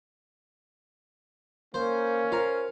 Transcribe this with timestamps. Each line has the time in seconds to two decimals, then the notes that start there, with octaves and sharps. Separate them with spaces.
1.74 A#3 C#4 C5
2.32 F4 A#4 C5 F5